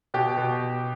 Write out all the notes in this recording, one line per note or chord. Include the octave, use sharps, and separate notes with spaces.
B2 G4
B2